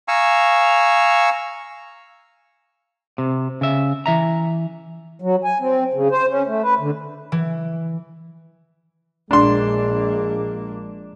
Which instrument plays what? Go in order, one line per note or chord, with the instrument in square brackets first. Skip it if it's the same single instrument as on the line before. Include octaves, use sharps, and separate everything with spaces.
[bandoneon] F5 G#5 A#5 C#6 E6
[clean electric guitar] C3
C#3 E5
E3 E5 A#5
[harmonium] F#3
G#5
C4
C#3
C5
C#4
A3
B4
D3
[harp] E3
[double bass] A#1 A#3 [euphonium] G#3 [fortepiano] D4 C6